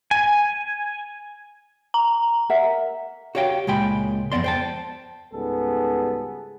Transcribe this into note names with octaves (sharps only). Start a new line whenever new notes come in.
G#5
A#5
A#4 E5 F#5
F#4 G4 C#5 F5 G5
C#2 A#2 G#3 G5 B5
F2 A#2 B3 D5 C6
C5 G5 A5
C#2 G#2 G3 B3 G#4 A4